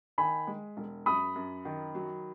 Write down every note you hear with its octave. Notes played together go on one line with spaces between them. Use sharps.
D#3 G#5 B5
G#3
E1
F#2 B5 D#6
F#2
D#3
F#3